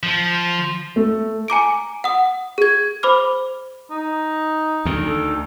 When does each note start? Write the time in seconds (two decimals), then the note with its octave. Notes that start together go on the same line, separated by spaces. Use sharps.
0.03 F3
0.96 A3
1.48 G#5 A#5 D6 D7
2.04 F#5 D#6
2.58 G#4 G#6
3.03 C5 B5 D6 F6
3.91 D#4
4.85 D2 D#3
5.06 A4